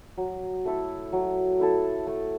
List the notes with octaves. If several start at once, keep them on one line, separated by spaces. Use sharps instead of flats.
F#3
A3 E4 A4
F#3
A3 E4 A4
A3